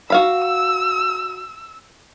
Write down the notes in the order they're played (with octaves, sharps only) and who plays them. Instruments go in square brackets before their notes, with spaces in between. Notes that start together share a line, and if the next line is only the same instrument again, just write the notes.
[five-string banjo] F#4 F5 B5 [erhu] E6